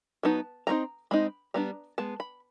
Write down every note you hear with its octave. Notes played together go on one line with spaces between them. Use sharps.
F#3 B3 D#4 A5
D#3 G#3 C4 D#4 A#5
G#3 C4 D#4 B5
G3 B3 D4 A#5
G#3 B3 A5
B5